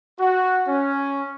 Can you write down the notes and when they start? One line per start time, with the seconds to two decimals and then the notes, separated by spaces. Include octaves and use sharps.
0.19 F#4
0.67 C#4